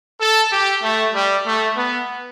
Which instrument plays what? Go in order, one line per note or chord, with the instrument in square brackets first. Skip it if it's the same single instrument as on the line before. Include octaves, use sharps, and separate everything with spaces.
[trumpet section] A4
G4
A3
G3
A3
B3